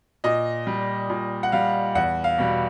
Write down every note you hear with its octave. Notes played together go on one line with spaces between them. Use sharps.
A#2 D#5
G3
A#2
F#5
G3 F5
E2 F#5
F5
B2 G3